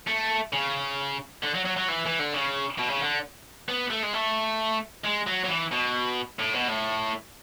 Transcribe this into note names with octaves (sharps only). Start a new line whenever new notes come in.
A3
C#3
D3
F#3
F#3
F#3
E3
E3
D3
C#3
B2
C#3
D3
B3
A3
G#3
A3
G#3
F#3
F#3
E3
B2
A2
B2
A2